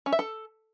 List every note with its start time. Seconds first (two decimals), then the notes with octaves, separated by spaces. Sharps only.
0.06 C#4
0.13 E5
0.19 A4